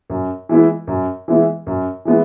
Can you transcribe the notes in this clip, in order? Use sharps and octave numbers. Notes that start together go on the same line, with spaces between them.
F#2
E3 G#3 B3 E4
F#2
E3 G#3 B3 E4
F#2
E3 G#3 B3 E4